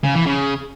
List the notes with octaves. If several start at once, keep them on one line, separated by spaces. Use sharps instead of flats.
C#3
E3
C#3